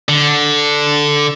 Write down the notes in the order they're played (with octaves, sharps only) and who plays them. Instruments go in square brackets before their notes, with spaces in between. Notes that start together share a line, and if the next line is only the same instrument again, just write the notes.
[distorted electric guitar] D3